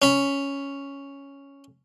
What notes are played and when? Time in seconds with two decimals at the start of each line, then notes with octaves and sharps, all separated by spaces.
0.02 C#4 B5